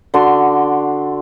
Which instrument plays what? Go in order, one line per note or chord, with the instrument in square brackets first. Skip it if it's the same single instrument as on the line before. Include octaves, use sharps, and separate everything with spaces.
[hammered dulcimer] D3 F#4 D5 C6